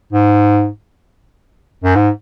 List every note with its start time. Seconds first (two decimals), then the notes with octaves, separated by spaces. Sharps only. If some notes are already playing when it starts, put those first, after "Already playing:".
0.13 G#2
1.84 F#2
1.95 G#2